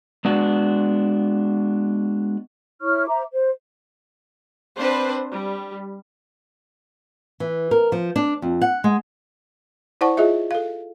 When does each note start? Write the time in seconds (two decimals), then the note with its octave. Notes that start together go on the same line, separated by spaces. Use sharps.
0.25 G#3 B3 D4 F#4
2.81 E4 C#5 C#6 F6
3.08 C5 E5 A#5 D6
3.32 C5
4.77 C4 D4 B4 C5
5.31 G3
7.40 E3
7.71 A#4
7.92 F3
8.16 D4
8.42 F2
8.62 F#5
8.84 G#3
10.01 E4 C5 D5 F#5 A5 C#6
10.17 F4 G#4 D#5 E5
10.51 A4 F5